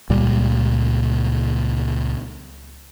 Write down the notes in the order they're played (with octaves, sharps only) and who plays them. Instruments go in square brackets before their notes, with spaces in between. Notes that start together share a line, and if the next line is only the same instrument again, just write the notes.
[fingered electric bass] C#2 A#2 G3